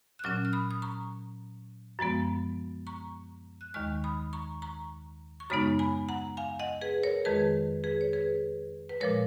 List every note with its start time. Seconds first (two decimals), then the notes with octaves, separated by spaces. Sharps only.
0.19 F#6
0.24 A#2 F#3 C#4 C#6 F6
0.45 F6
0.53 B5 D#6
0.71 D#6
0.82 A#5 C#6
1.99 F#2 F3 G#3 B3
2.87 A#5 C#6
3.61 F#6
3.74 D#2 D#3 G#3 C#6 F6
4.04 B5 D#6
4.33 A#5 C#6
4.62 A#5 C#6
5.40 C#6
5.50 F#2 C#3 G#3 B3 D#4 B5 D#6
5.79 G#5 B5
6.09 F#5 A#5
6.37 F5 G#5
6.59 D#5 F#5
6.81 G#4 B4
7.03 A#4 C#5
7.25 F2 D#3 G#3 G#4 B4
7.84 G#4 B4
8.01 C#5
8.13 G#4 B4
8.89 B4
9.00 A#2 F3 G#3 A#4 C#5